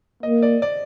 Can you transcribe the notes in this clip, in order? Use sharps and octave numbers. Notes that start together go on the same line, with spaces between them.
A#3 D#5
D5
D5